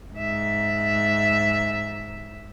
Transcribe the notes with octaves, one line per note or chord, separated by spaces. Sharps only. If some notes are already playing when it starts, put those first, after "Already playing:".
G#2 E5